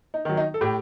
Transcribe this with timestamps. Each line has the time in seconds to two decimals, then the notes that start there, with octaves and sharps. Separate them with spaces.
0.14 D#4
0.25 D#3 F#3
0.37 D#4
0.54 A4
0.61 A2 G4